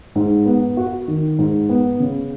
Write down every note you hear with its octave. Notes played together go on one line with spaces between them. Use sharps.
G#2
B3
F#4
D#3
G#2
B3
C#3